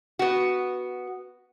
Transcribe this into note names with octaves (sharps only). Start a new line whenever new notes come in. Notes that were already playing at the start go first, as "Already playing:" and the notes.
B3 F#4